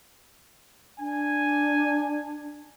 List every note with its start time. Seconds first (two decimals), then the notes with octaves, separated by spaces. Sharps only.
0.99 D4 G#5